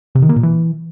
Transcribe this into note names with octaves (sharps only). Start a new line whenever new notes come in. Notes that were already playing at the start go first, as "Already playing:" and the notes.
C3
D#3
A#3
A#2
E3